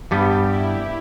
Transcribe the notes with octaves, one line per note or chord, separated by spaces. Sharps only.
G2 G3 B3 G4
E4